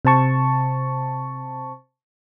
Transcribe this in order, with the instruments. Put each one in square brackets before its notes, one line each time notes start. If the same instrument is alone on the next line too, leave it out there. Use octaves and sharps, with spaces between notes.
[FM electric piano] C3 C5 A5 C#6